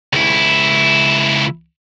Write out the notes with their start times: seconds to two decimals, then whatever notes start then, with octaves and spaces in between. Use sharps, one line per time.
0.13 C#2 E4